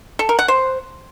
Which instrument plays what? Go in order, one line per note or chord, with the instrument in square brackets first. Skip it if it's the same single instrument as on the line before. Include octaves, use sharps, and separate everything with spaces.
[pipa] A4
A#4
F#5
C5